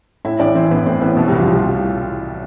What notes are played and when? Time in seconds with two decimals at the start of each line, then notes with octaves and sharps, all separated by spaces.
0.25 A2 E4 E5
0.40 A1 D4 D5
0.55 E3 C4 C5
0.70 A1 B3 B4
0.86 A2 C4 C5
1.01 A1 B3 B4
1.17 B2 A3 A4
1.28 C2 G3 G4
1.40 F3 F4
1.47 C2 G4
1.59 F4